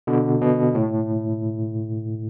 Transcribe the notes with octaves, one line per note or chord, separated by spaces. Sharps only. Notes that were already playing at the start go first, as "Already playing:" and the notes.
B2 D3
B2
A2